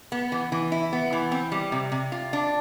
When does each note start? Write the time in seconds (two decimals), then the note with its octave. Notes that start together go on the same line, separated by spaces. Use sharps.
0.12 B3
0.32 E3
0.52 E3
0.72 E4
0.93 B3
1.13 E3
1.32 C4
1.52 G3
1.72 C3
1.92 C3
2.12 F4
2.33 D4